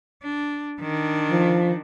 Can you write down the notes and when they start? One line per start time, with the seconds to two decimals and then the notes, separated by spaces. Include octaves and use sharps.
0.23 D4
0.81 D#3 D4
1.31 F3